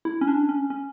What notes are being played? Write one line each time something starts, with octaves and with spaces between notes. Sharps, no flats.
E4
C#4
D4
C#4
C#4